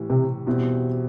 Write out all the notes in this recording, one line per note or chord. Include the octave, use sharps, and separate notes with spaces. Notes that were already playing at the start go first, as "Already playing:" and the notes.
Already playing: A2 E3 G3
C3
E2 B2 G3 C4 E4